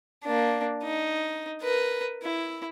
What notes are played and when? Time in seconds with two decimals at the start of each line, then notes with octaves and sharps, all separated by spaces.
0.24 A#3 D4
0.83 D#4
1.62 A#4 B4
2.23 E4